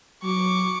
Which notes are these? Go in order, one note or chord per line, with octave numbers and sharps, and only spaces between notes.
F#3 C#6 D6